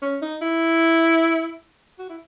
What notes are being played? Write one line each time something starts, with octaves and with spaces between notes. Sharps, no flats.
C#4
D#4
E4
F#4
E4